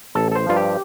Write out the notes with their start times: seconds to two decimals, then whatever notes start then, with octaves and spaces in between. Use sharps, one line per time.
0.15 A1 A4
0.32 A4
0.35 C5
0.46 G2 F3 F4
0.56 G4